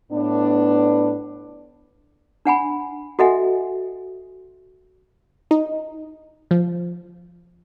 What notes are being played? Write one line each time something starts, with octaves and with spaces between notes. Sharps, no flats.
A2 B3 D4
D4 F#5 G#5 B5
F#4 A4 D#5 E5 F#5 G#5
D#4
F3